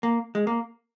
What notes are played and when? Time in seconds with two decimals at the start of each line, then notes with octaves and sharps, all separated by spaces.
0.03 A#3
0.35 G#3
0.47 A#3